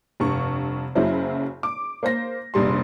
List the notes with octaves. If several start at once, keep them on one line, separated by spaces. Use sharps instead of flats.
F1 G2 C#6
F#1 C#3 F#3 E4 C5
D6
A#3 C5 A#6
F1 A#1 G3 C6